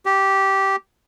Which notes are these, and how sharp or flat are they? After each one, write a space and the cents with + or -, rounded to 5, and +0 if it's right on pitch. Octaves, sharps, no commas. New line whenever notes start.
G4 -10